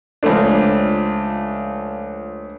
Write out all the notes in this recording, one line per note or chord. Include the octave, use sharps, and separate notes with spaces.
C#2 F3 A3 D4